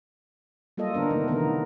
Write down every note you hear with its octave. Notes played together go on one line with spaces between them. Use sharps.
G3 A#3 F4 A4 D#5
D3 B3 D4 A#4 C5
C3 D#3 A3 B3 D#4
D#3 E3 A3 B3 A#4